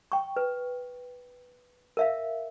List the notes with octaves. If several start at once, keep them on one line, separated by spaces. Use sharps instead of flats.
G5 C#6
B4
A#4 E5 F5